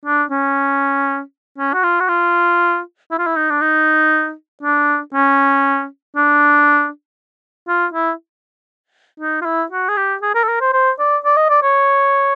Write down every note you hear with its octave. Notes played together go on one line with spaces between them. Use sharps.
D4
C#4
C#4
F#4
F4
F#4
F4
E4
F4
E4
D#4
D4
D#4
D4
C#4
D4
F4
E4
D#4
F4
E4
F#4
G#4
G4
G#4
A#4
A4
A#4
C5
C5
D5
D5
D#5
D5
C#5